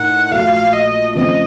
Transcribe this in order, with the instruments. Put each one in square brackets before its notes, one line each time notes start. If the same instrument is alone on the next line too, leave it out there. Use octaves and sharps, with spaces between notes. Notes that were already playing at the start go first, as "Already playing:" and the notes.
Already playing: [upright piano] A2 A3 D#4 A#4 [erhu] F#5
[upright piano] A#1 A#2 F#3 A3 [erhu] F5
[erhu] D#5
[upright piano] F2 C#3 F3 A3 C4 [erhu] D#5